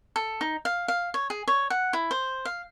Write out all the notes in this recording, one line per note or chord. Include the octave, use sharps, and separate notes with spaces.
A4
D#4
F5
F5
C#5
G#4
C#5
F#5
E4
C5
F5